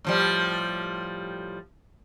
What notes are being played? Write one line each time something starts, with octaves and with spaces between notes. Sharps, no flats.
A2 F3 G3